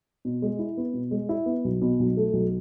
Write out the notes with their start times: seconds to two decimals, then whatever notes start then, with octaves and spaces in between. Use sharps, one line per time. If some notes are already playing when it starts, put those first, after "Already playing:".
0.25 B2
0.42 G#3
0.59 E4
0.77 B3
0.94 B2
1.11 G#3
1.29 E4
1.46 B3
1.64 B1
1.82 B2
1.99 B1
2.17 A3
2.33 B1